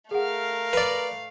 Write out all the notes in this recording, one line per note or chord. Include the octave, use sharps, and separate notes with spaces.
A3 G#4 A#4 F5 F#5
B4 D5